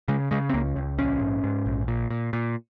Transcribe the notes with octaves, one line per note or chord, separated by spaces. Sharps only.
C#3 G#3
C#3 G#3
C4
C#2 A#3
C#2
A#1 C#4
G#2
G#2
A#1
A#2
A#2
A#2